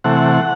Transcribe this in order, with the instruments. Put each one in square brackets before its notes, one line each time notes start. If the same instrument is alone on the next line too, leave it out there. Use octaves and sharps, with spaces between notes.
[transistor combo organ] C3 E3 A3 F#5